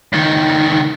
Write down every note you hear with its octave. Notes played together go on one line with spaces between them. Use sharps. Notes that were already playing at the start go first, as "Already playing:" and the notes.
C#2 D#3